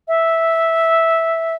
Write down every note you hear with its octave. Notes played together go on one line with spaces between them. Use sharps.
E5